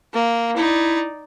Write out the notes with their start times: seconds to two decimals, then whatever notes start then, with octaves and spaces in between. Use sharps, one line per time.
0.13 A#3
0.56 D#4 E4 D5